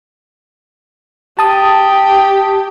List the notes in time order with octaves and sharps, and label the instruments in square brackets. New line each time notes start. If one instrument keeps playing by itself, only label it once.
[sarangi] G4 [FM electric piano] A5 D#6